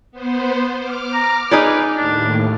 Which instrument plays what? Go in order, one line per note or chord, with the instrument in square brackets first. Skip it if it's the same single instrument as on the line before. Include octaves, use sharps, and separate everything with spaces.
[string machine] B3 C5
D6 F6
[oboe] A#5
[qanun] D#4 G#4 D5 [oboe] B4
[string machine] D#2 A2 [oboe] D4